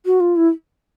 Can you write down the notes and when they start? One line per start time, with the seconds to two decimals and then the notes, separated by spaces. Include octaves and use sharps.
0.06 F#4
0.20 F4
0.36 E4